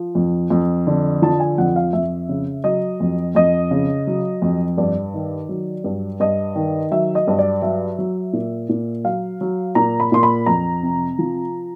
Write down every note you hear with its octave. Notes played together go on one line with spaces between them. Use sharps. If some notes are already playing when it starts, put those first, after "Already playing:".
Already playing: F3
F2
F2
D3
F3 A5
G#5
F2 F#5
F5
F2 E5
C#3
F#3 D#5
F2
F2 D#5
C#3
F#3
F2
G2 D5
D#3
F#3
G2
G2 D#5
D#3
F#3 E5
D#5
G2
D5
F#3 E5
F#3
A#2
A#2
F#3 F5
F#3
A#2 A#5
B5
A#2 C6
B5
F2 A#5
C3
F3